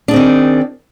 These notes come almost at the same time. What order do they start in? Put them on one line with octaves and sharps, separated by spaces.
D4 G#4 C4 D#3